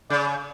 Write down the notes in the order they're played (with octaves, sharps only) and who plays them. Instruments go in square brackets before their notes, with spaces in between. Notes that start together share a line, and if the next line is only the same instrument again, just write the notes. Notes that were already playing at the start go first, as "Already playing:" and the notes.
[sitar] C#3 [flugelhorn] D5